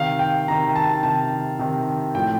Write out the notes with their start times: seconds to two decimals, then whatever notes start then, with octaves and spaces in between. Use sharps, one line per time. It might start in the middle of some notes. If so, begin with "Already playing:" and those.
Already playing: C3 D#3 F5
0.19 G5
0.48 C3 D#3 A#5
0.76 A5
1.03 C3 D#3 A5
1.59 C3 D#3
2.15 A2 F3 G5